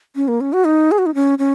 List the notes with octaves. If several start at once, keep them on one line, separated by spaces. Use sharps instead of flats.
C#4
A#3
C#4
F#4
D#4
G#4
F#4
D#4
C#4
C#4